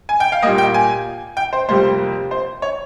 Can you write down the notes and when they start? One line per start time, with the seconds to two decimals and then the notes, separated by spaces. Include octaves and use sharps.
0.09 G#5
0.20 G5
0.32 F5
0.43 A#2 G3 A#3 D#5
0.58 G5
0.74 G#5
1.37 G5
1.53 C5
1.69 F2 C3 G3 A#3 C5
2.31 C5
2.62 C#5